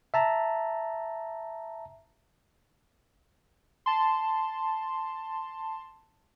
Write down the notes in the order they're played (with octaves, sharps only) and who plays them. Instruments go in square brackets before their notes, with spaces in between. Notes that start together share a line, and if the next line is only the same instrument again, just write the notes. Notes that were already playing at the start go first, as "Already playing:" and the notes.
[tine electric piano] E5 A5 A#5
[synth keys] A5 C6